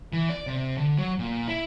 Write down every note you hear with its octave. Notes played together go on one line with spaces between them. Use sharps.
E3
D5
C3
D3
F#3
A#2
E4